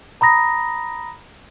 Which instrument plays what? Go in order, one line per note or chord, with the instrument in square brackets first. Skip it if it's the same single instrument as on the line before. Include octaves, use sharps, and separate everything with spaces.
[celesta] A#5 B5 D#6 A#6